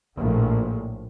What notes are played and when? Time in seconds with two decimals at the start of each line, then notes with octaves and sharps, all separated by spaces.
0.18 A#1 A2